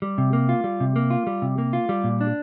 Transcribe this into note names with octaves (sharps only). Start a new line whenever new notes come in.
G3
C3
A#3
F4
G3
C3
A#3
F4
G3
C3
A#3
F4
G3
A#2
D4